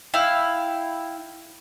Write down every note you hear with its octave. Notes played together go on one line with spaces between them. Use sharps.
E4 F5 G5